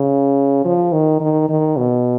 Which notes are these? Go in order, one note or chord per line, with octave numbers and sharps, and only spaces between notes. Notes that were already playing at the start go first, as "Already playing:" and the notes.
Already playing: C#3
F3
D#3
D#3
D#3
B2